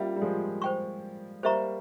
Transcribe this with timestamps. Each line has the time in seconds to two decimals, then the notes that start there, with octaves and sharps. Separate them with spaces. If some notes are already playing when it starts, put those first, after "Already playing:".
Already playing: G3 A#3 C#4 F4 A#4 E5
0.16 G3
0.21 F3 G#3
0.62 C5 G5 C#6
1.43 G3 A#3 C5 E5 A#5 C#6